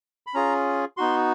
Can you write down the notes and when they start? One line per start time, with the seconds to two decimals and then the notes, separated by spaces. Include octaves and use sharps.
0.27 B5
0.34 C#4 F4 G#4 A#5
0.97 B3 D#4 F#4 C6